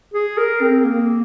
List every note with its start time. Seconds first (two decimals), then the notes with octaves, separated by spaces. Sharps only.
0.14 G#4
0.38 A#4
0.61 C4
0.85 A#3